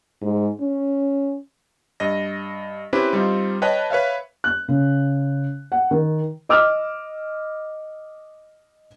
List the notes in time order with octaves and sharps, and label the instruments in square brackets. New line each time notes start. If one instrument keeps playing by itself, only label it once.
[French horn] G#2
C#4
[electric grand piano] G2 D#5 A#6
C4 C#4 E4 G4 B4
G3 C4 D#4 F4
B4 C#5 D#5 G5 A5 F#6
B4 C#5 E5 F5
[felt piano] F#6
C#3
F#5
D#3
D#5 D6 E6 F6